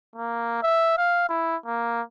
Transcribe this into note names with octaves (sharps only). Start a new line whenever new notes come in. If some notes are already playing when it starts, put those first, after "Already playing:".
A#3
E5
F5
E4
A#3